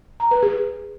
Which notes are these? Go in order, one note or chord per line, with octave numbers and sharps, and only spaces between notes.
A#5
B4
G#4